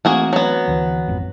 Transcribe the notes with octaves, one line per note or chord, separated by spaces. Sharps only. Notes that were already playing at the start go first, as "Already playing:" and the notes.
E3 A3 A#3 C4 F#4 G#4
F#3 B3
D2 E3
G#1 F2